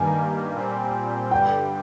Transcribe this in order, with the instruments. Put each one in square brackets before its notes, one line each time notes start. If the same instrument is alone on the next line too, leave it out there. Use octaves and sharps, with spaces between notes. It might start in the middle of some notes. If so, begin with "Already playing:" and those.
Already playing: [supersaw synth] G2 D#3 G3 A#3 [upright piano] G#5
[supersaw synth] A#2 G3 C4
[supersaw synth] G2 D3 G3 [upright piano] G5